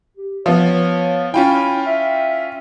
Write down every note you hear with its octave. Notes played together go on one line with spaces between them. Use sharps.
G4
F3 B3 C#5
C#4 E4 F4 G5
E5